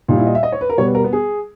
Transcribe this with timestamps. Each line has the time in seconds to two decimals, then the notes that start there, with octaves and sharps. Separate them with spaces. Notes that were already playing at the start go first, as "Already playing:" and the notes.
0.08 A#2 G3 D#4
0.18 E4
0.27 D#5
0.35 E5
0.43 D#5
0.52 C#5
0.61 B4
0.70 A#4
0.78 B2 G3 C#5
0.86 B4
0.95 A#4
1.04 B3
1.13 G#4